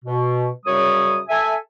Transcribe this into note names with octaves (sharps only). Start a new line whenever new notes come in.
B2
F#2 C#3 G3 C#5 D#6
A4 E5 G#5